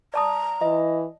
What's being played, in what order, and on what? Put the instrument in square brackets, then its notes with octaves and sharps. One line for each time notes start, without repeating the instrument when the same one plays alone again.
[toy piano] D5 A5 D#6 [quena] A#5
[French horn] E3 [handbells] D#5